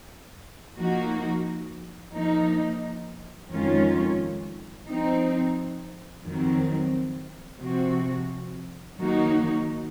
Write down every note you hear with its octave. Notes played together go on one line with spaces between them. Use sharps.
F3 A#3 D#4 F#4
F3 A#3 D#4
F2 D#3 G#3 C#4 F4
F3 C4 D#4
F2 D#3 F#3 C4
C3 F3 C4 F#4
D#3 F#3 A#3 D#4 F#4